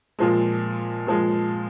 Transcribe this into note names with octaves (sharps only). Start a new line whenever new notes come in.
A#2 F3 G#3
A#2 F3 G#3